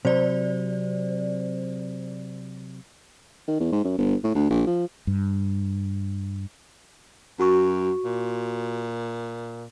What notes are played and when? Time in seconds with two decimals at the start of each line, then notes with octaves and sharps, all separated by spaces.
0.05 C3 F#3 C5 D5
3.48 D#3
3.60 E2
3.72 G#2
3.84 F#2
3.98 G1
4.24 A2
4.35 D2
4.50 A#1
4.67 F3
5.07 G2
7.39 F#2 F#4 C#6
8.05 A#2